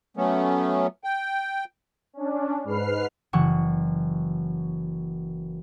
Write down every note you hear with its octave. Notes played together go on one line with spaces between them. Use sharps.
F#3 A3 B3 C#4
G5
C#4 D4
G#2 B4 F6 C7
F#1 E3 F#5 C#6